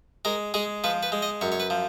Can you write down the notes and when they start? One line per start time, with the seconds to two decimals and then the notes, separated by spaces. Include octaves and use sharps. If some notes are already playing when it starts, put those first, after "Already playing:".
0.25 G#3 A#4
0.54 G#3 G#4
0.84 F3 B4
1.03 B4
1.12 G#3
1.22 D#5
1.41 F#2 C#5
1.52 C#5
1.60 B4
1.70 F3